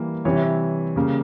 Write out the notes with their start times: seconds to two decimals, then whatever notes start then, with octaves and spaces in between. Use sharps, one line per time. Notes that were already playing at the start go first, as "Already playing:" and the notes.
Already playing: E3 G3 A#3
0.25 C3 E3 G3 C#5
0.35 E5
0.44 C#5
0.96 C#3 G3 A#3